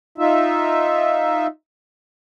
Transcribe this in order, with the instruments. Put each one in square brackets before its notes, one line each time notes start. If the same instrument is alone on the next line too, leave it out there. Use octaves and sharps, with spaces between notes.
[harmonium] D#4 F4 E5